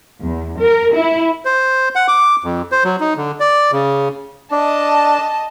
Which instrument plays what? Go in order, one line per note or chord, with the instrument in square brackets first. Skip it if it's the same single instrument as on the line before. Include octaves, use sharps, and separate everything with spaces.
[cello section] E2
A#4
E4
[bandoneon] C5
F#5
D6
F2
C5
F#3
D#4
D3
D5
C#3
[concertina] D4 [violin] D#5 A5